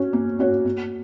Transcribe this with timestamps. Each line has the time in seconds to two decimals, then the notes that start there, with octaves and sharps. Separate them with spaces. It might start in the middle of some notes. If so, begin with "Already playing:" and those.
Already playing: C#4 F#4 C#5
0.13 A#3
0.39 C#4 F#4 C#5
0.65 A#3